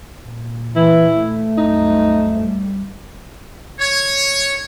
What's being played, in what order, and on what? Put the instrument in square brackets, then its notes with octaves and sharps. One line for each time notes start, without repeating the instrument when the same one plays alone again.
[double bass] A#2
[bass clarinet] E3 [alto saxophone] E4
[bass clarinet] A3
[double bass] C2 F#2 [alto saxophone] D#4
[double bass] G3
[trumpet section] C#5